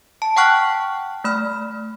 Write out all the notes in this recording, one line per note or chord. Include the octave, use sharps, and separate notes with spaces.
A5
F#5 G5 A5 C#6 F6 F#6
A3 B5 F6